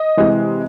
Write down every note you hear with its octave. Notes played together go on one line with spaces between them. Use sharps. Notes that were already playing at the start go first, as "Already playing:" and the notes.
Already playing: D#5
C3 E3 G#3